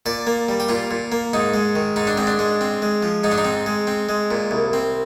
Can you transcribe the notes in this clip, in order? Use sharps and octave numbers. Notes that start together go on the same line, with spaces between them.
A#2 D5
A#3
G3
G4
A#2 F4
A#2
A#3
G#2 D#4
G#3
D#3
G#2 D#4
D4
G#2 C4
D4
G#3
C4
G#3
F3
G#2 D#4
D4
D#4
C4
G#3
C4
G#3
A#2
C2
C4